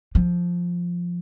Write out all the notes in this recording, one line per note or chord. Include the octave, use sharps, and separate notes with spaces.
F3